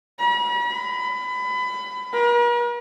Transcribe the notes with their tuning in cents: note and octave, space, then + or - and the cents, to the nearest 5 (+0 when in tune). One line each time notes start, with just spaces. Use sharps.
B5 -45
B5 +25
A#4 +45